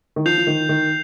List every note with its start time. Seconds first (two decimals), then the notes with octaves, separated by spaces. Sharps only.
0.16 D#3
0.25 F3 G6 C7 F7
0.38 F3
0.47 D#3
0.69 D#3